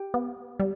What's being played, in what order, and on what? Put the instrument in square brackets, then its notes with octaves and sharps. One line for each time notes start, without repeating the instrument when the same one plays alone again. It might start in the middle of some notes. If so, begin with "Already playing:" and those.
Already playing: [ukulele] G4
[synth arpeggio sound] B3
G3